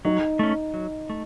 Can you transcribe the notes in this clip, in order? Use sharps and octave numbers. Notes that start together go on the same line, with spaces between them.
F#3 D#4
A3 C#4
F#3
A3